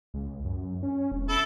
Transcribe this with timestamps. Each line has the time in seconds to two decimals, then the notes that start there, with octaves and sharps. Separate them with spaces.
0.14 C#2
0.45 F#2
0.83 C#4
1.12 E1
1.29 E4 A4